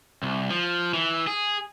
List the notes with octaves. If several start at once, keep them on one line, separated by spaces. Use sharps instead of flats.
C2
F3
E3
G#4